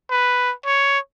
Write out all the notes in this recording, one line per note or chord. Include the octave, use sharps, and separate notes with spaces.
B4
C#5